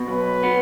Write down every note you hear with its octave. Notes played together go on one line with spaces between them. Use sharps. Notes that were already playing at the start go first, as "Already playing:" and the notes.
Already playing: B2
B1 B4
B3